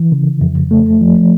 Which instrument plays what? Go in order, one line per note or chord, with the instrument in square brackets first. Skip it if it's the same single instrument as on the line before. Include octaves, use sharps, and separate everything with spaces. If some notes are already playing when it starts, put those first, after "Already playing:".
Already playing: [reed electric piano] E3
C#3
F2
A3
F3